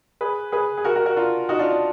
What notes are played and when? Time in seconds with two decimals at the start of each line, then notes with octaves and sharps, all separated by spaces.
0.21 G#4 B4
0.52 G#4 B4
0.77 G#4
0.84 F#4 A#4
0.96 F#4 A#4
1.06 F#4 A#4
1.16 D4 F4
1.49 D#4 F#4
1.59 D4 F4
1.70 D4